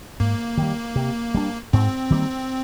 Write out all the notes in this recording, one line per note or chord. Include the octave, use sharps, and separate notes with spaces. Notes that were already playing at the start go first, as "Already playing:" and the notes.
G#2 A#3
D#3 G3
C3
G3 D4
G#2 C4
D#3 G3 A#3